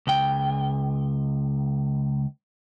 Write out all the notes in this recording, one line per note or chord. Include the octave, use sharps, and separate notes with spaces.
C#2 G5